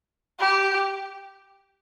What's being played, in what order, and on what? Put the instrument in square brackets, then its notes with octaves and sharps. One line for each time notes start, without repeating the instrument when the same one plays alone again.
[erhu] G4